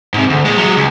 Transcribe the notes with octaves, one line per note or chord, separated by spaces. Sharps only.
G#2 C3
D2
A#2 G#3
F#3 G#3
C#2